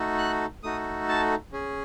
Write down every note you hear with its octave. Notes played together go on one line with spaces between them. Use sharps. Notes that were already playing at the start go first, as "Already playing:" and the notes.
Already playing: A3 D#4 F#4 A4
F#6
A3 D#4 F#4 A4 D#6
A5
C#4 G#4